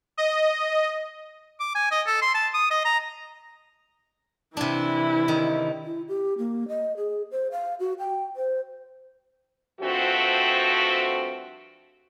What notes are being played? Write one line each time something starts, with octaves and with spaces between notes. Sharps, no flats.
D#5
D6
G#5
D#5
A4
C6
A5
D#6
D#5
A#5
C3 E3 D4 E4
D#3
E4
G4
A#3
D#5
G#4
C5
F5
F#4
G5
C5
G2 F3 A3 C4 F#4